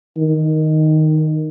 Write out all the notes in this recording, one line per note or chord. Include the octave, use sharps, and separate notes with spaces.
D#3